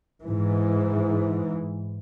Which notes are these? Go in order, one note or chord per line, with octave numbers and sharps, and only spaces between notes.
G#2 E3